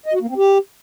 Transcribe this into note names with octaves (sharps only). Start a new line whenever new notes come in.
D#5
F#4
A#3
C4
G4